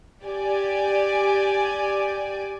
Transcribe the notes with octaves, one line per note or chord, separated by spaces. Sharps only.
G4 D5 G#5